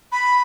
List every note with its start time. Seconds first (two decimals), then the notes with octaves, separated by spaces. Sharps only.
0.12 B5